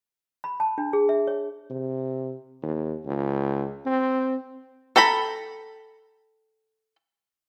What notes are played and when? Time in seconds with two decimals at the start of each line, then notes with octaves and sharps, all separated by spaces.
0.44 B5
0.60 A5
0.78 D4
0.93 G#4
1.09 E5
1.27 C#5
1.70 C3
2.63 D#2
3.06 C#2
3.86 C4
4.96 A4 G5 A#5 B5